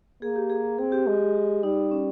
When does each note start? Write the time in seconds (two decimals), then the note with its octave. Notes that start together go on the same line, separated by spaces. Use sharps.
0.22 A#3 G#4
0.36 G4
0.50 G#4
0.79 C4 G#4
0.92 G4
1.07 G#3
1.35 G4
1.63 G3 D#4
1.91 C#4